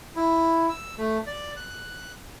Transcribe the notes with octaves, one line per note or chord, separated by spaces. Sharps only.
E4
E6
A3
D5
F#6